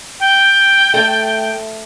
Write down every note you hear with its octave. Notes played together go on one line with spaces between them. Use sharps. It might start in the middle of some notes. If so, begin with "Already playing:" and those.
G5
A3